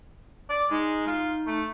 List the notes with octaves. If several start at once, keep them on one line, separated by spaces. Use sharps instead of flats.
D5
G#3 D#4
F4
A3